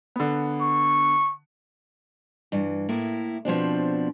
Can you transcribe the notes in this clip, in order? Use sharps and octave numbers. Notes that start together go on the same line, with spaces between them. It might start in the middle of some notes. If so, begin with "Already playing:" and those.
D3 B3
C#6
G2 E3
A2 A#3 E4
B2 F3 C4 D4